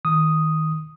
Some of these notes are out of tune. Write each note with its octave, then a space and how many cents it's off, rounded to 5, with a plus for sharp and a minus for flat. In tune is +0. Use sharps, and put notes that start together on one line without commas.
D#3 +20 D#6 +0